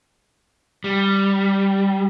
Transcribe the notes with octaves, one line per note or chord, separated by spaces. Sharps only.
G3